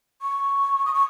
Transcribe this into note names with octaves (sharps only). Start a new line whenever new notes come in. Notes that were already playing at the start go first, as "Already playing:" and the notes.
C#6
D#6
C#6